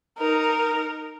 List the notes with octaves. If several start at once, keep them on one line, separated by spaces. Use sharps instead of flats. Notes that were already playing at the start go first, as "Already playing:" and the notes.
D#4 A#4